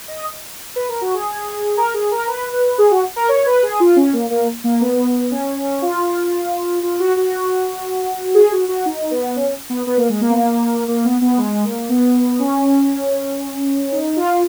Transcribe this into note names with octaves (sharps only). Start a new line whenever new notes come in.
D#5
B4
A#4
F#4
G#4
A#4
G#4
A#4
B4
B4
G#4
F#4
A#4
C#5
B4
G#4
F4
C#4
A#3
A#3
A#3
B3
C#4
F4
F4
F#4
F#4
G#4
F#4
F#4
D#4
B3
C#4
B3
B3
A#3
G#3
A#3
B3
A#3
A#3
B3
B3
G#3
A#3
B3
C#4
D#4
F4